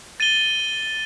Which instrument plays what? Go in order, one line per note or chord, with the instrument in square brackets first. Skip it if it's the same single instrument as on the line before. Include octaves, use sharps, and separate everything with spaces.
[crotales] A6 D#7 G7